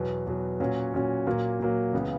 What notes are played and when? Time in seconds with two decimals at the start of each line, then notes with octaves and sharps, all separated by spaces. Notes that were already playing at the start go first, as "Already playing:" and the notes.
Already playing: E2 B2 F#3
0.26 E2 B2 F#3
0.60 A#2 F#3 C#4 F#4
0.94 A#2 F#3 C#4 F#4
1.27 A#2 F#3 A#3
1.60 A#2 F#3 A#3
1.93 C#2 C#3 E3 B3